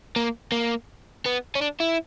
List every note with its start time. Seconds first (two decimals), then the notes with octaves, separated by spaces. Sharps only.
0.16 A#3
0.52 A#3
1.26 B3
1.55 C#4
1.61 D4
1.80 E4